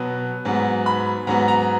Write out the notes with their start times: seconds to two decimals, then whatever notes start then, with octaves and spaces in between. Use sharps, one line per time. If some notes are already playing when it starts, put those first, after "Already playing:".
Already playing: B2 F#3 B3
0.45 G#2 F#3 B3
0.86 B5
1.27 G#2 F#3 B3 A#5
1.48 A#5